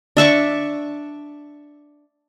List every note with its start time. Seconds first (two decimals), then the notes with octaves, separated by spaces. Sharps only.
0.17 D4 E5 C#6 D6